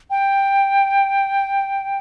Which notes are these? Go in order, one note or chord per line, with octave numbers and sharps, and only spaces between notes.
G5